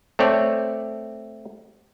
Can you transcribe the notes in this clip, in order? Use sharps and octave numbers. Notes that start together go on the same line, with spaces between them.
A3 C4 C#5 D5